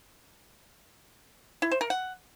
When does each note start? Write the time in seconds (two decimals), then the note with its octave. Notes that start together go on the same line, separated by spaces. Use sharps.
1.62 E4
1.71 C5
1.81 A#4
1.90 F#5